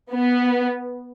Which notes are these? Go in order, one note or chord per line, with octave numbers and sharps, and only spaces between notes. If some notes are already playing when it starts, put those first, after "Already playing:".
B3